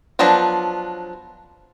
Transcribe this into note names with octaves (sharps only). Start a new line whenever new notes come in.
F3 F#3 B3 D4 F4